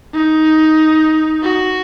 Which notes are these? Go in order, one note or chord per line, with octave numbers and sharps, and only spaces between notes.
D#4
F#4